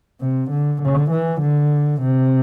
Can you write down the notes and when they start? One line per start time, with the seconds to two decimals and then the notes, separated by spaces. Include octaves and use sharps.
0.21 C3
0.51 D3
0.82 D3
1.11 E3
1.41 D3
2.02 C3